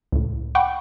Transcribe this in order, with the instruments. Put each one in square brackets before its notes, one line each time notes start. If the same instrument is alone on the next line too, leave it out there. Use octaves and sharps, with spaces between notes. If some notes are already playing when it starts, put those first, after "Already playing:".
[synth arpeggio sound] C#2 A2
F#5 G5 B5 C#6 D6